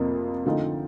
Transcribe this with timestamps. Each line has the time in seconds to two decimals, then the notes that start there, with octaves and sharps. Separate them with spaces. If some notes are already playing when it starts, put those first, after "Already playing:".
Already playing: F2 C3 F3 A#3
0.45 D3 F3 A3 C4 D#4